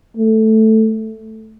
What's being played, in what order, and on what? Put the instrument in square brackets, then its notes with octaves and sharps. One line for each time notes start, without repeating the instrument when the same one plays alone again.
[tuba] A3